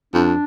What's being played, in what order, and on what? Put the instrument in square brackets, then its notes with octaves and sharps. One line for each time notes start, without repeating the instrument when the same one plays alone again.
[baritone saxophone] F2 [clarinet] D4